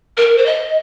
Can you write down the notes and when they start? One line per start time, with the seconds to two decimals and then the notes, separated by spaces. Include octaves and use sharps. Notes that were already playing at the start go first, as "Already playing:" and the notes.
0.17 A#4
0.38 C5
0.46 D#5